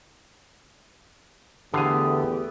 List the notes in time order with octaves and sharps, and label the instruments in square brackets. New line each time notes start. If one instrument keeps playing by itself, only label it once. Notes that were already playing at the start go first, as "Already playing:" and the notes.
[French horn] E2 [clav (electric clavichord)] D3 F5 G#5 [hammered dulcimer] A3 B3 [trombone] G4